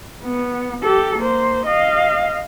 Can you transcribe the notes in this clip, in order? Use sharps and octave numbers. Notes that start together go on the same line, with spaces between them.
B3
G4 A4
A#3 C5
D#5 F5